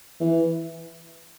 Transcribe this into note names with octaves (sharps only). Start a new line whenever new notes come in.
E3